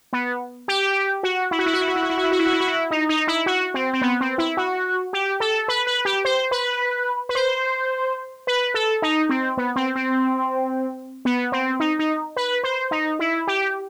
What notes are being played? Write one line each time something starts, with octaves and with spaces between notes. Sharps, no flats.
B3
G4
F#4
E4
F#4
E4
F#4
E4
F#4
E4
F#4
E4
F#4
E4
F#4
E4
F#4
E4
F#4
E4
D#4
D#4
E4
F#4
C4
C4
B3
C4
E4
F#4
G4
A4
B4
B4
G4
C5
B4
B4
C5
B4
A4
D#4
C4
B3
C4
C4
B3
C4
D#4
D#4
B4
C5
D#4
E4
G4